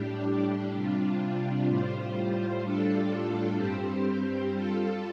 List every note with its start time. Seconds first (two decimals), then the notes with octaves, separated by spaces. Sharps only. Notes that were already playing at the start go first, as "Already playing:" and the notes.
Already playing: A2 G3 D4 G4
0.74 C3 G3 D4 F4
1.68 A2 G3 F4 C5
2.64 A2 G3 D4 F4 A4
3.58 G2 G3 C4 G4 C5
4.52 G3 F4 A4